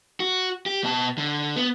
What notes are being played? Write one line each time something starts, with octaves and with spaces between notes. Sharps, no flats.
F#4
G4
B2 A5
D3
B3